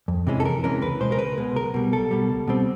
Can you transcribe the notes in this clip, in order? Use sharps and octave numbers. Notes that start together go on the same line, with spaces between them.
F2
C3 E3 G#3 C#4
A4
F2 A#4
C3 E3 G#3 C#4 A#4
C#2 B4
B2 G#3 C5
A#4
C#2 B4
B2 G#3
B1 A#4
B2 G3
B1 A4
B2 G3
C#2
B2 G3 C4